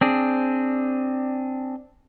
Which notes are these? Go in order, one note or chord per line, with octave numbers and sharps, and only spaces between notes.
C4 D4 G#4